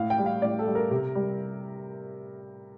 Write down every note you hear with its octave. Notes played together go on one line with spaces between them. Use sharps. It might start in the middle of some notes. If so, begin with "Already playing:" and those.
Already playing: A2 F5
G5
G3
F5
A2 D5
A4
G3
A#4
C3
G3